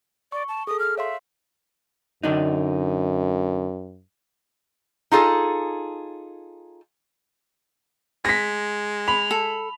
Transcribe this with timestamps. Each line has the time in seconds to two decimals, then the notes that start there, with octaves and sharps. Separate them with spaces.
0.32 D5 C#6
0.48 A5
0.67 G#4 A4 D#6
0.79 F6
0.98 C#5 E5 F5 C6
2.23 F#2 D3 D4 D#4
5.12 D#4 F4 G#4 A4
8.25 G#3 A#6 B6
9.08 B5 F7
9.31 A4